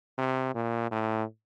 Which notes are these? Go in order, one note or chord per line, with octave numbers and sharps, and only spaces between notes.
C3
A#2
A2